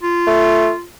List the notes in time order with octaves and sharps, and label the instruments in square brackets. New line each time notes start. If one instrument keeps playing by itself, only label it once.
[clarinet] F4
[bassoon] A3